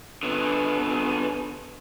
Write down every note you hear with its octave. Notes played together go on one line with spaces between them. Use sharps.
D3 B3